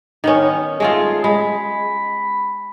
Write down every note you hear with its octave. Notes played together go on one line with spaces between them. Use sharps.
D#3 B3 C#4
G#3 A3 F4 G#4
G#3 B5